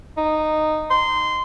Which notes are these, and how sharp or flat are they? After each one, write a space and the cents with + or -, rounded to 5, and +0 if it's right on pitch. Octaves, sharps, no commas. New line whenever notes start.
D#4 -10
C6 -15